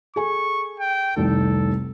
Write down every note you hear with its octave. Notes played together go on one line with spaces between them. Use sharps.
G#4 A4 G#5 C#6
G5
F1 C2 D#3 A4